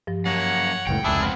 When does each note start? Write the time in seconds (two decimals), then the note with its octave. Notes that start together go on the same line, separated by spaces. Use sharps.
0.07 G2 F3
0.26 F#2 A#3 C#5 F#5
0.87 F#1 C#2 A2 G5
1.04 F1 C#2 D4 E4 G#4
1.22 C4 F#5 B5 E6 F6